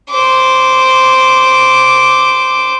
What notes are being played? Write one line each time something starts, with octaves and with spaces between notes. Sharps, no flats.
C5 D6